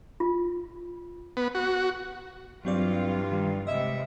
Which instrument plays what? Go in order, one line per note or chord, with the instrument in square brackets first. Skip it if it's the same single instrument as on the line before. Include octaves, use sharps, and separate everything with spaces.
[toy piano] F4
[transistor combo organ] B3
F#4
[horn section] G2 [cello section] E3 F4 [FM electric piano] F#3 C4 D5
[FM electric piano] D#3 G3
[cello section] C3 G3 G#3 [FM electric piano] D#5 [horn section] E5